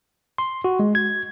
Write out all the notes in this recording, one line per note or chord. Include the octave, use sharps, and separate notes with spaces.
C6
F#4
G#3
G#6